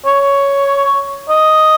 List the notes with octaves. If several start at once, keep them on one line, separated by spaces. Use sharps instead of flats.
C#5
D#5